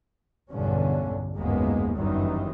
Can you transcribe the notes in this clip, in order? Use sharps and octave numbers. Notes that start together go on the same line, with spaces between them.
B1 E2 G2 D3 C#4
F#1 D#2 G#2 G#3 A#3 B3
G1 F#2 D#3 E3 G3